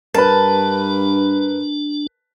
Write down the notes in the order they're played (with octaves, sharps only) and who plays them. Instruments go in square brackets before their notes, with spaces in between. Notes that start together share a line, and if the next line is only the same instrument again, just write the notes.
[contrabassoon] G2 [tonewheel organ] D4 [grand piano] A#4 B4 [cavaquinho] A5